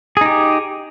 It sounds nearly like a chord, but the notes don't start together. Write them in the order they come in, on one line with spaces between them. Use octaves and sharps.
G#4 D#4 G4